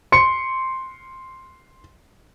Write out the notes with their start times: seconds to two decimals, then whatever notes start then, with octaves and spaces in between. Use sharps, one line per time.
0.12 C6 C#7